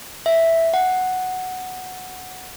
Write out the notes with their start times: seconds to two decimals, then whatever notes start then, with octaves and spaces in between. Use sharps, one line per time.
0.26 E5
0.74 F#5